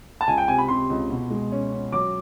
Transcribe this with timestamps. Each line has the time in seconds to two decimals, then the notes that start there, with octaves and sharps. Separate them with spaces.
0.21 A5
0.27 C#2 G#5
0.38 G5
0.48 C3 G#5
0.58 B5
0.68 C3 C6
0.90 C#2
1.10 B2
1.30 G#3
1.52 C#4
1.72 C#4
1.92 F#3 D6